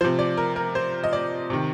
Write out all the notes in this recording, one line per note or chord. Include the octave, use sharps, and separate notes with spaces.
C3 F3 C5
D5
A#4
A#4
C5
D#5
D5
C3 D#3